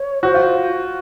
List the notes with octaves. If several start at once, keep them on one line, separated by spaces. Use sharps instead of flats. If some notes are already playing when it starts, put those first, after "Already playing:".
Already playing: C#5
F#4 C5
F4